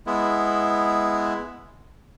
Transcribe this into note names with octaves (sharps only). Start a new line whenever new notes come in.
G#3 B3 E4